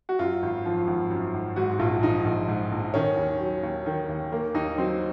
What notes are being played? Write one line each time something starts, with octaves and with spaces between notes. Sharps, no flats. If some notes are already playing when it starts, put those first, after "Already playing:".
F#4
F#2 F4
G#1
F3
G#1
F#2
G#1
G#2 F#4
A#1 F4
F3 D#4
A#1
G#2
A#1
D#3 C#4
D#2
F#3
D#2
D#3
D#2
D#3 A#3
D#2 D#4
F#3 C4